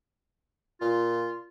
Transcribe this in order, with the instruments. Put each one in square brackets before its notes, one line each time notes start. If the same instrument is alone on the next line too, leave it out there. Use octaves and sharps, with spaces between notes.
[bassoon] A#2 [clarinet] F4